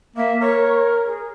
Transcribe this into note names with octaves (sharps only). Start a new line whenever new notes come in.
A#3 E5
A#4 C#5
G#4